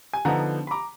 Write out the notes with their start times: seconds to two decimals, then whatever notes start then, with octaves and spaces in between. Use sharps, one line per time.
0.13 G#5
0.25 D3 F3 B3 D#4 F#5 A#5
0.67 B5
0.71 A#5 D6